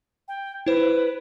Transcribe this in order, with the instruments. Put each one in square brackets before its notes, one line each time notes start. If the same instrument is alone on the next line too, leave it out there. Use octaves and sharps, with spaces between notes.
[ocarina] G5
[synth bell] E4 C5 [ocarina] B4